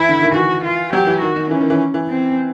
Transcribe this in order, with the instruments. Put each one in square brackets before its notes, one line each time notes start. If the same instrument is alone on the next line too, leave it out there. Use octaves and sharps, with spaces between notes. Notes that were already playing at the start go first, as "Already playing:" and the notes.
Already playing: [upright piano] E3 [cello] E4
[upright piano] D3
D#3
[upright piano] E3 [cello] F#4
[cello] F4
[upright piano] F#3 [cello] G4
[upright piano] E3
[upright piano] D#3 [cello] F#4
[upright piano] D#3
[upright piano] E3 [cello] C#4
[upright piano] D#3
E3
E3
[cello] C4